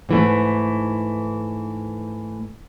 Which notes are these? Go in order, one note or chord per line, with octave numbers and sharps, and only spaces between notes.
G#2 E3 A3